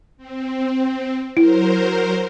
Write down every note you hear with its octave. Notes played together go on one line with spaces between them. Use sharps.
C4
F#3 E4 A#4 C5